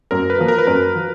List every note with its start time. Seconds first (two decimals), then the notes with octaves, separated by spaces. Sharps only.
0.11 F#2 A#4
0.30 B4
0.38 F3 A#3
0.48 A#4
0.58 B4
0.67 F#2 A#4
0.95 F3